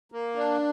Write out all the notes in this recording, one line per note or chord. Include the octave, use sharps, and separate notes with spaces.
A#3
D4